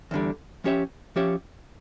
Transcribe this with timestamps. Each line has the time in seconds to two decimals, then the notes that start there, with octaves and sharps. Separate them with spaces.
0.11 E2 D3 G3
0.64 F3 C#4 G4 C#5 E5
1.16 F3 C#4 G4 C#5 E5